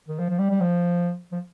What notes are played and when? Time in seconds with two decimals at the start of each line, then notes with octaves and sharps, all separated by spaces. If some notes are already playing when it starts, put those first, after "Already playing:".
0.08 D#3
0.19 F3
0.30 F3
0.39 G3
0.50 G3
0.61 F3
1.32 F3